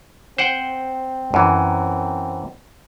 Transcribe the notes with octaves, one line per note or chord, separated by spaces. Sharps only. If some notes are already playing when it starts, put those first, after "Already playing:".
C4 C5 F#5 G5
F#2 E3